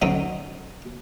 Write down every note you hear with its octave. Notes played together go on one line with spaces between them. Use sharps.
D3 F#3 C4 C#4 D#4